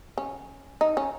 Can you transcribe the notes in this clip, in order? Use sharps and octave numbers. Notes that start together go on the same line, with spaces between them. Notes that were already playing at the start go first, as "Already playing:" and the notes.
C#4
D#4
C#4